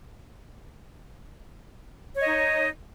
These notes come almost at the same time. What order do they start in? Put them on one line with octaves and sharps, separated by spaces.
C#5 D#5 D#4